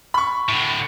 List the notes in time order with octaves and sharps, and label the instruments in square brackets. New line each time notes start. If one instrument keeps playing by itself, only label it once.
[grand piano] B5 C#6
[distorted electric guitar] A2 D3